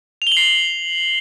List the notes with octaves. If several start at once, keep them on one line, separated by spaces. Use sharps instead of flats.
F7
G7
F#7
C7
F#7